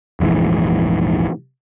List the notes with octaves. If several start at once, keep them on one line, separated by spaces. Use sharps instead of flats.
F1 A#1 G#2 E3